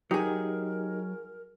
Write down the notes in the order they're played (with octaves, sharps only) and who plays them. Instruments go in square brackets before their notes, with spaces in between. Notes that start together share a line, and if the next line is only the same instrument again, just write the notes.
[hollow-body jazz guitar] F#3 G#4 [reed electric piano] D#4 G4 D#5 [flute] A#4